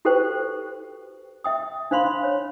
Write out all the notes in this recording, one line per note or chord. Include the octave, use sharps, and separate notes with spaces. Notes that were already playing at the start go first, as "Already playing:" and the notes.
F#4 G4 A4 B4 C5 G5
E5 G5 D#6
D4 C5 F5 B5 C6
C#5